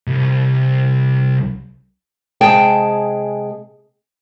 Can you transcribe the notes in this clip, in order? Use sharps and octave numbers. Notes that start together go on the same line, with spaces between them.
C2
C3 G#3 G#4 G5 A5